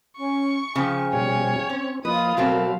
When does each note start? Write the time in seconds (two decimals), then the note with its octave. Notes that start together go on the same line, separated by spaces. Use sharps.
0.17 C#4 C#6
0.76 C#3 F3 C5 G5 G#5
1.13 B2 G3 C#5
1.70 C4 C#4
2.05 F3 A#3 F4 B4 D#5 D#6
2.37 B2 F#3 A3 C4 A#4 F5